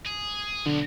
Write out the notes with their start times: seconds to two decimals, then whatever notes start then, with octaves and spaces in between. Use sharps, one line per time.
0.06 G#4
0.66 B1 D3